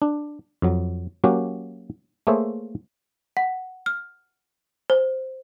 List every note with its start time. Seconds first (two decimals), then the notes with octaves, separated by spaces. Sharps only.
0.02 D4
0.62 F2 F#3
1.24 F#3 A#3 C#4 F#4 G4
2.27 A3 A#3 G#4 C5 C#5 E5
3.37 F#5
3.86 F6
4.90 C5